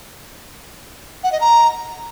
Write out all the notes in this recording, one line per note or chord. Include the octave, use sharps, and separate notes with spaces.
F#5
D#5
A#5